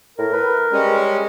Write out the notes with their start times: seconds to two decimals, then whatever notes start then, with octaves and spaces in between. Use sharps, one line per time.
0.18 A2 A#4
0.33 B4
0.73 G3 G#3 C#4